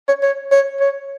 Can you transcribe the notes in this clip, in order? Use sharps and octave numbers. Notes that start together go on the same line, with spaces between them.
C#5
C#5
C#5
C#5